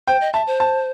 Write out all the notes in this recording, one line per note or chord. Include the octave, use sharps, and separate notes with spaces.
C5 G5
D#5
E5 A5
C5
A5